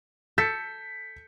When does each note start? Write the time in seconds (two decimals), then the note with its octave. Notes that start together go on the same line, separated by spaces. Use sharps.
0.38 A4 G6 B6 C#7